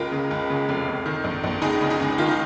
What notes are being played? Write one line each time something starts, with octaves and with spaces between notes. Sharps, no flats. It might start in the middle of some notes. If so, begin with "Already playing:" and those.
Already playing: C#2 F4 A#4
C#3
C#2
C#3
F1
F1
D#3
A#1
A#1
C#2 D#4 G#4
C#3
D#4 G#4
C#2
D#3 F4
D#4